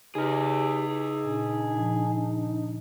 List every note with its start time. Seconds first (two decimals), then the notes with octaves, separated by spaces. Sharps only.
0.15 C#3 D#4 G4 G#4 B4 F6
1.25 A#2 D4
1.75 A#2 F3